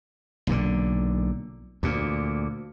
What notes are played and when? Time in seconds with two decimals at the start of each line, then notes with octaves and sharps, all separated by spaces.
0.47 B1 A#2 D3
1.83 D2 A#2